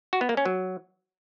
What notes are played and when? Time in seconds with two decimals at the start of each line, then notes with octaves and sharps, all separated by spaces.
0.13 F#4
0.21 B3
0.29 A#3
0.37 C#4
0.46 F#3